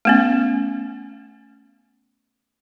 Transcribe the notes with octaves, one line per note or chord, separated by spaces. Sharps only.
A3 B3 C#4